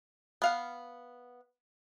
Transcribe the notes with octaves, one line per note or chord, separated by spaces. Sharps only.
B3 F5 F#5